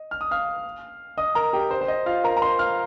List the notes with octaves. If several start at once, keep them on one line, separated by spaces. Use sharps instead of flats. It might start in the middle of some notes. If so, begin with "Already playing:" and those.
Already playing: D#5
F6
D#6
F5 F6
D#5 D#6
A#4 A#5
G4 G5
C5
C5
D#5
F4 F5
A#4 A#5
A#5
C5 C6
F5 F6